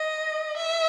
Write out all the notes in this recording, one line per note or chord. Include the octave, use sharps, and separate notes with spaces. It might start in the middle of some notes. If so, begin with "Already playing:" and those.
Already playing: D#5
E5